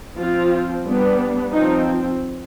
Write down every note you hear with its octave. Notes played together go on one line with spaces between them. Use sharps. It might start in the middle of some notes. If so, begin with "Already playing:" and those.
F3 C4 F4
G3 B3 D4
F3 C4 D#4